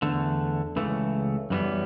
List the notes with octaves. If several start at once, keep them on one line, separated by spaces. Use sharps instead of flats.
E2 D3 A3
C#2 C#3 E3 A3
F#2 E3 G3 B3